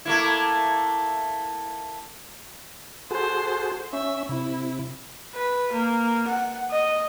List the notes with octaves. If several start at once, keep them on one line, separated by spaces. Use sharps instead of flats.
A3 A#3 E4
F#4 G#4 A4 C5
C#4 E5
C3 E4
B4
A#3
F#5
D#5